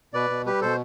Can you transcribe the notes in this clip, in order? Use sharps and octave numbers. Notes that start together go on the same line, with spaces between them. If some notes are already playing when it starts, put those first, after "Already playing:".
B2 B4 D5
B2
G3 G4 B4
B2 A4 C5